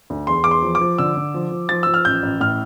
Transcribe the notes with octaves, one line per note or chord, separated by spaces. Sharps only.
D2
E2 C6
E2 D6
C6
F3
D6
F3
D3 E6
D3
F3
F3
F3 A6
F3 E6
F6
A1 G6
A1
A2 F6